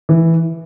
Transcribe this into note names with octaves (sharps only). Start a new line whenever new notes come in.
E3